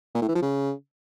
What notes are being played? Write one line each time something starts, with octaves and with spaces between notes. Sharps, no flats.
A#2
A2
E3
F3
C#3